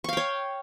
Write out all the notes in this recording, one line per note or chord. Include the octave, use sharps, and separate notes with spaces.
C#5 F5 G5 C#6